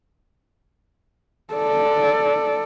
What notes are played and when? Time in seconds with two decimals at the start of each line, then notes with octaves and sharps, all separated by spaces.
1.54 A4 D5